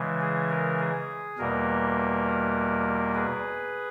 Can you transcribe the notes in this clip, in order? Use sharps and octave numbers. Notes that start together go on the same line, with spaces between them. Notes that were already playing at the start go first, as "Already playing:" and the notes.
Already playing: C#3 E3 G#3
G#4
A#4
G#4
E2 B2 G3 A#3 A#4
G#4 B4